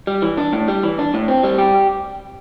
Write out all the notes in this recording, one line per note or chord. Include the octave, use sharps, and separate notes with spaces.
G3
E3
D4
A2
G3
E3
D4
A2
C4
G3
G4